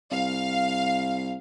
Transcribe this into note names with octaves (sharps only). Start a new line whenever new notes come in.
C2 F5